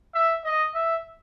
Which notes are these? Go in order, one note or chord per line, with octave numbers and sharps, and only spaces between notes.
E5
D#5
E5